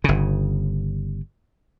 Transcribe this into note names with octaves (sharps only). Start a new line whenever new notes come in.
G1 C#3